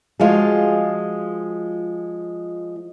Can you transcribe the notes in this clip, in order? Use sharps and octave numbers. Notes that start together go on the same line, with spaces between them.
F3 G#3 F4 F#4 G#4